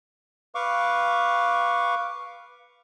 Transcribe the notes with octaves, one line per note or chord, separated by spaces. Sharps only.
B4 F5 C#6 D6